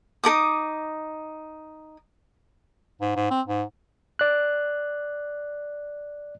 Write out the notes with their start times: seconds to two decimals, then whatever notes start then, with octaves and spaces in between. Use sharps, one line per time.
0.24 D#4 A#4 D6 D#6
3.01 G#2
3.16 G#2
3.31 C4
3.47 G#2
4.19 D5 F#6